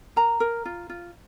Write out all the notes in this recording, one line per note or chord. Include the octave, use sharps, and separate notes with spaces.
A#4 A#5
A#4
F4
F4